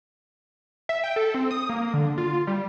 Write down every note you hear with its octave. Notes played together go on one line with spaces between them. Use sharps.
E5
G5
A4
C4
D#6
A#3
D3
F4
G3